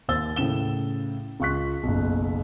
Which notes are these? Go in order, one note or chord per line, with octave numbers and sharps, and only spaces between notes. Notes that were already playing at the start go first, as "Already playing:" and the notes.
D#2 C5 E6 A6 G7
A2 C#3 E7 G7
C#2 F4 C#6 F#6 B6
F#1 B1